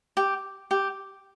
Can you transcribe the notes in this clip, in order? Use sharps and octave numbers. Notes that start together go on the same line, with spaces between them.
G4
G4